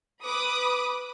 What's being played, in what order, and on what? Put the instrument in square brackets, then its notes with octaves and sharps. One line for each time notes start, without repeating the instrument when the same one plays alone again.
[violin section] B4 B5 D6 D#6